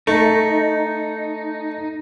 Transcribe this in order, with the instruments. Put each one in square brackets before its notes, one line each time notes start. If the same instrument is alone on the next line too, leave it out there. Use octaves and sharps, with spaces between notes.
[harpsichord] A3 [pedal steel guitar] D#4